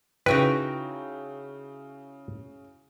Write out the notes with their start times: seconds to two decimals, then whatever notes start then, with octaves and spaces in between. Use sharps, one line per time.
0.26 C#3 D#4 E4 F#4 B4 G5